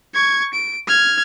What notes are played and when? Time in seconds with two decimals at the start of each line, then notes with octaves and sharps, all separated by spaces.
0.14 C#6 G#6
0.53 D7
0.88 F6 G#6